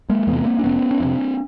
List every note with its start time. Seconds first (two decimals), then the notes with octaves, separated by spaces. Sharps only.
0.09 G#3 A#3
0.27 E2 C3 A3 B3
0.46 A#3 C4
0.59 D4
0.64 F1 B3 C#4
0.91 C#4
1.00 F2 C3 C4 D4